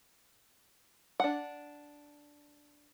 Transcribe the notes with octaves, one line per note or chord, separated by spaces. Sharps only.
D4 F#5